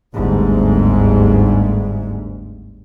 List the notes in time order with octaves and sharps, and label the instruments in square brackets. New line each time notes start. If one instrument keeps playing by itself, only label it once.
[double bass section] G1 D2 G#2